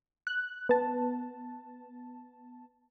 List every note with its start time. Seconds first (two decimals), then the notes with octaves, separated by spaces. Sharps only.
0.27 F#6
0.69 B3 A5